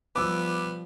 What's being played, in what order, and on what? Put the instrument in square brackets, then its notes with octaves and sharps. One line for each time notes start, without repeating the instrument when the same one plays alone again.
[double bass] F3 G3 [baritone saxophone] B3 [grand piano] D6 E6